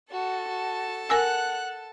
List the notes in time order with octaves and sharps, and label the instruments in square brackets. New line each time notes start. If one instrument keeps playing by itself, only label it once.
[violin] F#4 [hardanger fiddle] A4 A5
[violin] F#4
[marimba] A#4 G#5 E6 [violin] F#5 F#6